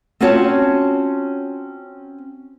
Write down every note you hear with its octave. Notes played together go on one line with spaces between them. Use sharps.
C4 C#4 F4 F#4 C#5 A5